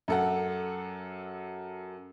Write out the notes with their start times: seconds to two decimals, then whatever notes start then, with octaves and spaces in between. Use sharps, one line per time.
0.08 F#2 A4 F#5